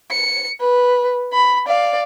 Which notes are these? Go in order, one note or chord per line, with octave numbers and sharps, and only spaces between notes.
C#7
B4
B5
D5 F5